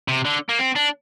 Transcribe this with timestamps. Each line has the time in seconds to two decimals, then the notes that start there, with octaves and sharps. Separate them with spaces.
0.08 C3
0.25 D3
0.49 A#3
0.59 C4
0.76 D4